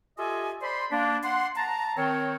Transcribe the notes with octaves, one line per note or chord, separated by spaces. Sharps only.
F4 G4 A4 D#5 E5 G#5
C5 D5 B5 C6
A#3 D4
F#5 C6
A5 A#5
D#3 C4 C#5